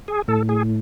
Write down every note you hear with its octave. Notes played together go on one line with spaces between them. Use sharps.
G#4
A2 A4
G#4